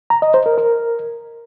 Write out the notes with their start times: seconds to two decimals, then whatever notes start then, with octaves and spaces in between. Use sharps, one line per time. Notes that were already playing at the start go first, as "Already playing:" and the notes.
0.10 A#5
0.22 D#5
0.34 C5
0.46 A#4
0.58 A#4